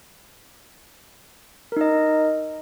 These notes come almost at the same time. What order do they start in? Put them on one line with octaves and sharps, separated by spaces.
A#4 D#4 D#5